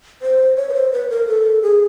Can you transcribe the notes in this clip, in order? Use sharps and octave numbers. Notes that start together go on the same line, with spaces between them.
C5
C#5
B4
C5
B4
A#4
A4
G#4